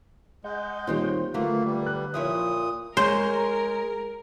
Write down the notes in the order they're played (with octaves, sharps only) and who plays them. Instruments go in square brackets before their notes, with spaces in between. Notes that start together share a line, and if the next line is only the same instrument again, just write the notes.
[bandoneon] G#3 [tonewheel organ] D#5 F#5 G6
[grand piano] A#2 D#3 G3 [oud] C4 C5 C#5
[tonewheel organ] D3 B4 [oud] F#3 A3 [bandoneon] A#3 [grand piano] F4
[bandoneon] G3
[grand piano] F#6
[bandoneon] A#2 D#6 [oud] F3 E4 C#5
[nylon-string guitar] G#3 C#5 [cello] A#4 [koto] C5